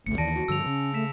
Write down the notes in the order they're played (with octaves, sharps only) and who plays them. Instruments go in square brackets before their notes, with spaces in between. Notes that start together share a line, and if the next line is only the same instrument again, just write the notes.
[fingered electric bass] G1 C#2 [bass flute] A3 [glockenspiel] C#7
[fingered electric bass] D#2 D#3 E3 [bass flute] D5 [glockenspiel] A5 A#6 D7
[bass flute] F#4
[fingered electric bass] G2 D3 F3 [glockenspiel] E6 F7
[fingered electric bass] C#3 [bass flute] C#4
[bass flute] A3 [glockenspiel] B6 E7